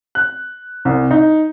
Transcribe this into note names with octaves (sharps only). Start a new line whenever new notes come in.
F#6
C2
D#4